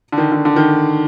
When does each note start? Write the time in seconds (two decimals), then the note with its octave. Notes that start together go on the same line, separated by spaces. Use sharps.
0.12 D3
0.18 D#3
0.32 D3
0.45 D3
0.56 D#3